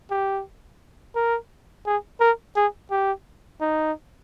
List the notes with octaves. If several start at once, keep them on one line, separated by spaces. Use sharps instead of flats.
G4
A#4
G#4
A#4
G#4
G4
D#4